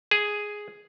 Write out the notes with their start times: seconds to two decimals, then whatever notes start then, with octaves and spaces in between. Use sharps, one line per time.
0.11 G#4